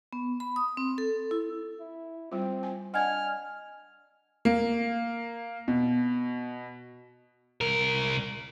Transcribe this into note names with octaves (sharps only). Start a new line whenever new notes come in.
B3
B5
D#6
C4
A4
E4
E4
G3 C4 F4
G#5
D4 D#5 F#5 G#5 F6 G#6
A#3
B2
C2 A#4